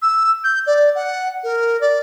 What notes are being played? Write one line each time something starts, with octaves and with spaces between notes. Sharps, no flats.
E6
G6
D5
F#5
A#4
D5